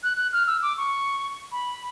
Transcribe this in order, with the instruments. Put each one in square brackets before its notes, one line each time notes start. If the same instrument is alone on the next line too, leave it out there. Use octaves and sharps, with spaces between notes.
[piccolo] F#6
F#6
F6
E6
D6
C#6
B5